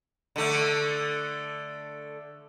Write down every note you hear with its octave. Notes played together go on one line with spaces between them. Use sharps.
D3 A3